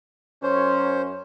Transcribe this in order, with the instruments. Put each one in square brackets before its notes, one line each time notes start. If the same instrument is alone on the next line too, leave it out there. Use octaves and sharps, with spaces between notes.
[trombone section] F#2 C#4 [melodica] C5